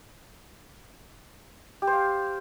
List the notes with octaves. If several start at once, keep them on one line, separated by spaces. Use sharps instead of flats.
G4
C5
F5